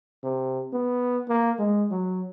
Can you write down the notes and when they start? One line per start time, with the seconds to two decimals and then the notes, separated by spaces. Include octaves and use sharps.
0.23 C3
0.73 B3
1.29 A#3
1.59 G#3
1.91 F#3